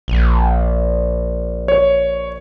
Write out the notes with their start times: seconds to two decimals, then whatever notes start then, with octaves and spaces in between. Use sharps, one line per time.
0.08 A#1
1.68 C#5